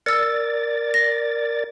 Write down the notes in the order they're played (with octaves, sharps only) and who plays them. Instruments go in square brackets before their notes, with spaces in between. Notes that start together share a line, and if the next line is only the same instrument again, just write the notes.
[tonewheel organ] A#4 D5 A6 [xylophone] E6 C#7
[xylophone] A#6